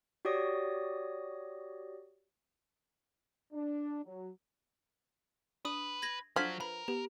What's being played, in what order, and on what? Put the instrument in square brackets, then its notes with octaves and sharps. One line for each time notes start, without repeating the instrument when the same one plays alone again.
[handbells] F#4 G4 C#5 D5 D#6 A#6
[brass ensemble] D4
F#3
[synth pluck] D4 D#7 [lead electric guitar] B4 [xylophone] D#6
[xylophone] G#6 A#6 F#7
[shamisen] F3 [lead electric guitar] F#3 [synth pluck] D4 A4 F#5 [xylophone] F6 G#6 B6
[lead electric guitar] A#4 [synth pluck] B4 [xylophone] B5
[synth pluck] B3 [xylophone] G4